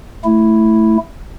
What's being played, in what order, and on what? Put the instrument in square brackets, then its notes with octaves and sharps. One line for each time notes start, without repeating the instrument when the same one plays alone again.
[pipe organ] A3 E4